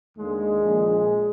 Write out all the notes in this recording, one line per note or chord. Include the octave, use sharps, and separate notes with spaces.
D#2 D3 G#3
A#1 A#2